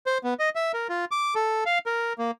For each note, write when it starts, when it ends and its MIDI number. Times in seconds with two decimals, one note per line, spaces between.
0.06 0.18 72
0.24 0.34 59
0.39 0.49 75
0.55 0.72 76
0.74 0.87 70
0.89 1.05 65
1.11 1.34 86
1.35 1.64 69
1.66 1.79 77
1.86 2.13 70
2.19 2.31 58